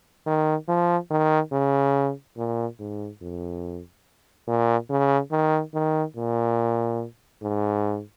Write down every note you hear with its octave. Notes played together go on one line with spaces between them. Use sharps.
D#3
F3
D#3
C#3
A#2
G#2
F2
A#2
C#3
D#3
D#3
A#2
G#2